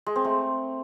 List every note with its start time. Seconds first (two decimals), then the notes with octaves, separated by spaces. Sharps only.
0.06 G#3
0.16 C4
0.25 A3